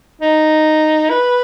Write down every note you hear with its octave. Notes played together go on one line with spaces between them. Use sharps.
D#4
B4